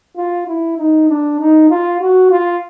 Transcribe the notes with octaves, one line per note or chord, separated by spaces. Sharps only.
F4
E4
D#4
D4
D#4
F4
F#4
F4